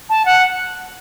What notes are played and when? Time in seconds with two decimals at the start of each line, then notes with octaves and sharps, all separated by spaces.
0.10 A5
0.25 F#5